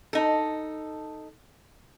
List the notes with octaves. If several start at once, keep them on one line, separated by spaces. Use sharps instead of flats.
D#4 A4